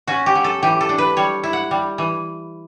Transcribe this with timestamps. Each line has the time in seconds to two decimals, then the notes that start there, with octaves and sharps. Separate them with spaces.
0.07 C#4 F#4
0.26 G4
0.35 F#3
0.44 A4
0.63 E3 G4
0.81 A4
0.89 D4
0.98 B4
1.17 G3 C#5
1.43 E4
1.53 F#5
1.71 G3
1.98 E3